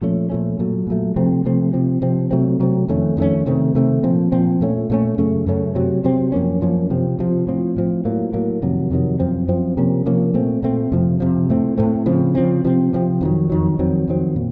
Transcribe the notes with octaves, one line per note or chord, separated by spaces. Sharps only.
A#2 F3 A3 C#4
A#2 F3 A3 C#4
A#2 F#3 A3
A#2 F#3 A3
C3 F3 A3 C4
C3 F3 A3 C4
C3 F3 C4
C3 F3 C4
C3 F#3 A3 C4
C3 F#3 A3 C4
F2 D#3 A3 C#4
F2 D#3 A3 C#4
C3 D#3 A3 C4
C3 D#3 A3 C4
A#2 F3 C4
A#2 F3 C4
A#2 A3 C#4
A#2 A3 C#4
F#2 C#3 A3 C#4
F#2 C#3 A3 C#4
C3 F#3 C4
C3 F#3 C4
F#2 F3 A#3 C#4
F#2 F3 A#3 C#4
C3 F3 C4
C3 F3 C4
A2 F3 C4
A2 F3 C4
A2 F#3 A#3
A2 F#3 A#3
F2 C3 D#3 F#3
F2 C3 D#3 F#3
F#2 F3 C4
F#2 F3 C4
C3 F3 A#3 C#4
C3 F3 A#3 C#4
A#2 A3 C4
A#2 A3 C4
F2 C3 F3
F2 C3 F3
A2 A3 C4
A2 A3 C4
C#3 F3 C4
C#3 F3 C4
C3 F3 C4
C3 F3 C4
F2 D#3 F#3
F2 D#3 F#3
F2 D#3 F#3 C4
F2 D#3 F#3 C4
A#2